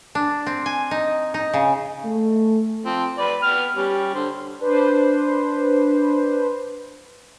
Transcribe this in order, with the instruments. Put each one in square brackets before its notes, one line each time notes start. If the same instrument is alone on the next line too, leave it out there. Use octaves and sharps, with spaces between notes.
[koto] D4
C4
G#5
D#4
D#4
C#3
[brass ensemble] A3
[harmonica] F3 C4
B4 D5
B3 G5 F6
G3 C#4
D3 C5
[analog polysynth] D4 B4 C5